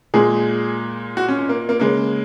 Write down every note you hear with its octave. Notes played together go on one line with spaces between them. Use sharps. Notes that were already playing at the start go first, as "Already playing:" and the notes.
A#2 G#3 G#4
F#4
C#4
C#4
A#3
A#3
C#3 G#3 A#3